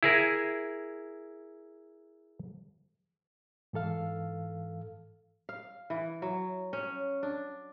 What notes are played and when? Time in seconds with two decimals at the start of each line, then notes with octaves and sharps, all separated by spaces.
0.03 E4 G#4 A#4
3.73 G#2 E3 A4 F5
5.49 F5
5.90 E3
6.22 F#3
6.73 C#4
7.23 D4